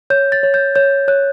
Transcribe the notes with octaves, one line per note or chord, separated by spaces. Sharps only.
C#5 G6
A6
C#5
G6
C#5 G6
C#5 F#6